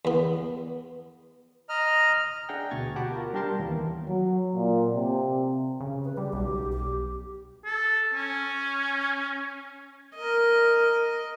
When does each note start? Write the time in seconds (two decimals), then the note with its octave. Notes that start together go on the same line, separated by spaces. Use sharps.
0.05 E2 B3
1.69 D#5 A#5 F6
2.49 D4 G#4 E5 F#5 G5 A#5
2.71 D2 B2 C#6 G#6 A6
2.96 F#4 G4 F#5 A5 B5 D6
3.11 F4 A#4
3.33 G3 D4 G4 A#4 A5 C6
3.59 D#2 E3 A#3 B3
4.08 F#3
4.56 A#2
4.94 C3
5.81 C#3
6.05 B4
6.17 G3 G4
6.33 B1 G4
6.72 G4
7.65 A4
8.14 C#4
10.15 A#4 D#5